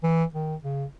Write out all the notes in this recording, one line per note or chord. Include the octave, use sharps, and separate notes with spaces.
E3
D#3
C#3